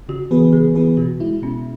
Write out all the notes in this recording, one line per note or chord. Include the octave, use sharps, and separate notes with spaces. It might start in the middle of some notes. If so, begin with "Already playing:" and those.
C#3 F#4
E3 B3 G#4 B4
C#3 G#4
E3 B3 G#4 B4
B2 F#4
G#3 E4
B2 C#4